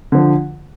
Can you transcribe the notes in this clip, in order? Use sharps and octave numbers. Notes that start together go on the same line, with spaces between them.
D3 F3